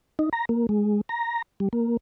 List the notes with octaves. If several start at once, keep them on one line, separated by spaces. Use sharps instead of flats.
D#4
A#5
A#3
G#3
A#5
G3
A#3